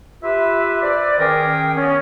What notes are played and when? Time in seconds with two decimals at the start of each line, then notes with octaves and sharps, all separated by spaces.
0.23 F4 G4 B4 E5
0.82 B4 C5 D5
1.19 D#3 C#4 G#4 A#4 G5
1.76 B3 C#4